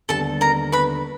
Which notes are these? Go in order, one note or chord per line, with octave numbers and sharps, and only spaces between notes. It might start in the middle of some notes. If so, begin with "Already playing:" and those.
D#2 D3 G3 B3 A4 A5
A#4 A#5
B4 B5